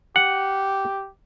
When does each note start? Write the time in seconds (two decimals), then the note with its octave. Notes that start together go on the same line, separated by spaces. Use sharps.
0.16 G4 F#5